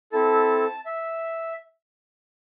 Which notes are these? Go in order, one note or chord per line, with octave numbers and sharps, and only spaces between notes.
C4 E4 A4 A5
E5